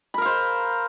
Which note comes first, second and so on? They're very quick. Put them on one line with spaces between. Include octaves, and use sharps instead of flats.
B5 A#4 F5 C5